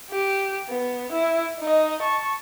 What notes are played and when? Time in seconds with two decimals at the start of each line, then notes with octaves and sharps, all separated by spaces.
0.11 G4
0.69 B3
1.12 E4
1.59 D#4 D#5
2.02 A5 C#6